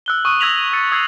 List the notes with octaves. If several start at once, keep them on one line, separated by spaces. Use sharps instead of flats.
E6 F#6 G7
C#6 D#6 F#6 D#7
E6 G#6 A#6 B6 F7 F#7
E6 A6 C#7
D#6 E6 G#6 C7